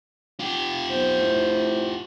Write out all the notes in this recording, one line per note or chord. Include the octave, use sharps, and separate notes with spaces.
F4 G4
B1 C5
A2